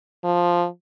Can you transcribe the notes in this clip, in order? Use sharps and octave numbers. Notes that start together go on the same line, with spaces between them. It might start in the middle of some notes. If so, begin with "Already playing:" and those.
F3